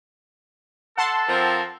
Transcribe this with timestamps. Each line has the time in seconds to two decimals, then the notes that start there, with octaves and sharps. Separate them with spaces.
0.98 A4 F#5 A5 C6
1.27 F3 C4 A#4